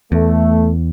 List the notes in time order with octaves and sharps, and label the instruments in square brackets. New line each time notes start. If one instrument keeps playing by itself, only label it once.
[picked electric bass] E2 [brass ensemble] A3